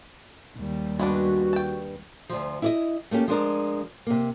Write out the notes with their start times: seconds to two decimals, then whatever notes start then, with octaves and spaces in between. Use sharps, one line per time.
0.57 D#2 G3
0.99 G2 G#3 B3 D4 F#4
1.53 G5 A5
2.29 D2 F3
2.62 E4 D5 D#5
3.11 A3 A#3 C#4 G4
3.28 F3 G#3 D4 A#4
4.07 C3 A#3